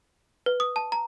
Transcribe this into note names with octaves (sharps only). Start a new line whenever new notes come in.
B4
D#6
A5
A#5